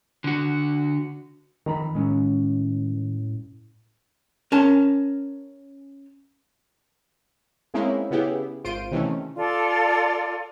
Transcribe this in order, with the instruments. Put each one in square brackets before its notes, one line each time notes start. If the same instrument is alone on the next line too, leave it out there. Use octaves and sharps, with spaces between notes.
[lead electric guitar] D3 F#4
[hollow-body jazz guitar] F2 A#5 B5 [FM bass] D#3
[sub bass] A2 [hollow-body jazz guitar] G#3 C#4
[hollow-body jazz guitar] C#4 A#4 A5
[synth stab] G#3 A#3 C4 C#4 D#4 E4
C#3 B3 E4 G4 G#4
G#1 F4 C5 C6 D7 D#7
C3 D#3 E3 A3 C#4
[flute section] F4 A4 D5